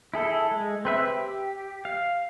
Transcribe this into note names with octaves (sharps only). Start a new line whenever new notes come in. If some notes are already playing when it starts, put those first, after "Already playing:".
E4 G#4 A4
G#3
C4 B4 E5
G4
F5